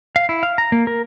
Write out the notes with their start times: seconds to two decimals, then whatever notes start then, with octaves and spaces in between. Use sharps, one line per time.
0.16 F5
0.29 E4
0.43 F5
0.58 A#5
0.72 A#3
0.87 A#4